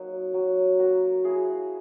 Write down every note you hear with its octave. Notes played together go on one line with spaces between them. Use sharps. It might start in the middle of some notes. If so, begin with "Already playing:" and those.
Already playing: F#3 A#3 D#4
F#3
A#3 F#4
E4 G#4